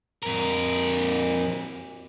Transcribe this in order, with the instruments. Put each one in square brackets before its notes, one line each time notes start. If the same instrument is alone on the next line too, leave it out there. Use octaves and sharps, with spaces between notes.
[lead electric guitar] F2 A#4